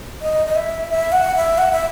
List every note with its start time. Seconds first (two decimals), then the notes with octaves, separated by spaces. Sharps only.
0.22 D#5
0.46 D#5
0.56 E5
0.90 E5
1.12 F#5
1.35 E5
1.58 F#5
1.72 E5